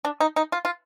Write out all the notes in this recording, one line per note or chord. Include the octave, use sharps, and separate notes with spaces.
D4
D#4
D#4
F4
F4